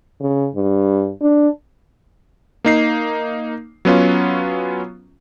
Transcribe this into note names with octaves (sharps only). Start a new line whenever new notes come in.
C#3
G2
D4
A#3 D#4 C7
F#3 B3 C#4 F4